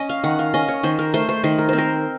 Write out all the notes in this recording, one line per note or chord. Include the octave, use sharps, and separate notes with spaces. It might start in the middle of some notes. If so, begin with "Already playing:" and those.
Already playing: C#4 D#5
F5
D#3 F#5
F5
C#4 D#5
C#5
D#3 C5
A#4
A3 C5
C5
D#3 C5
A#4
C4 C5
A#4